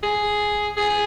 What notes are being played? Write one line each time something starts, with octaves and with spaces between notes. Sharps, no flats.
G#4
G#4